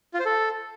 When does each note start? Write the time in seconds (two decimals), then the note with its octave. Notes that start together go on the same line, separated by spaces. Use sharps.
0.14 F4
0.20 C5
0.25 A4